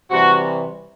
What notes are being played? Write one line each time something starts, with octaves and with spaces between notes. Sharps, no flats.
C3 E3 G3 F#4